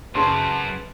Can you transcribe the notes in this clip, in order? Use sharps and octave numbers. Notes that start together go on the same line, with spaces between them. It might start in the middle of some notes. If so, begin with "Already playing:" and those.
F#2 C#3 B4 A5 C6